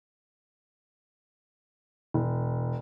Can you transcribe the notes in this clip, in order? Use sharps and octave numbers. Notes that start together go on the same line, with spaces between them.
E1